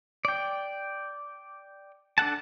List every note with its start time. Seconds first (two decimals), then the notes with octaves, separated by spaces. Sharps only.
0.25 D5 G5
2.18 D4 A4 F#5 A5